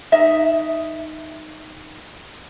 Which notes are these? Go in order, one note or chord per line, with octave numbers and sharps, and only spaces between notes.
D#4 E5